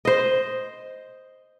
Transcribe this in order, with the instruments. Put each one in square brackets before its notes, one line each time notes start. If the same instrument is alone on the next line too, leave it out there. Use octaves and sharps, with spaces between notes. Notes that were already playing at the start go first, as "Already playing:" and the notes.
[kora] C5 D#5